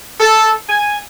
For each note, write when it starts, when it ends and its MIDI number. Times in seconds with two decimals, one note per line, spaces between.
0.20 0.51 69
0.68 0.97 80